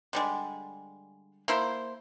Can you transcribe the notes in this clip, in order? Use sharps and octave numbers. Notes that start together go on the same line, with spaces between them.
D3 G3 G#3
A#3 E4 C5